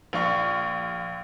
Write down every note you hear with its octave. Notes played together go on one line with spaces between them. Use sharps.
A#1 F4 C#6